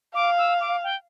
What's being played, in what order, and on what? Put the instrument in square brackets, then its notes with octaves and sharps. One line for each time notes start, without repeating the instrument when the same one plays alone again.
[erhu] F5 [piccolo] D6
[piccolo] E6
D6
G5